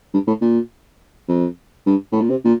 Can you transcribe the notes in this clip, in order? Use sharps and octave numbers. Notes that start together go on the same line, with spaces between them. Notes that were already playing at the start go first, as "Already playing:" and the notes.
G2
A2
A#2
F2
G2
A2
A#2
C3
A#2